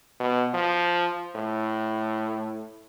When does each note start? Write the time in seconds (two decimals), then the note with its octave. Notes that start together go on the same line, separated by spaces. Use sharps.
0.20 B2
0.54 F3
1.36 A2